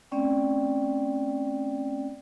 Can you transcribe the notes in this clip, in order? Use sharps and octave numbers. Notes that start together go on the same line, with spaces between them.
A3 C4 C#4 D5 G5